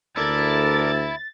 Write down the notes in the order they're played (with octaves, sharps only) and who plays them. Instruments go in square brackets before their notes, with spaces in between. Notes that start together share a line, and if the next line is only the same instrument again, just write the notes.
[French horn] D2 [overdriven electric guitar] E4 [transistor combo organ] A4 A#4 D5 [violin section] A6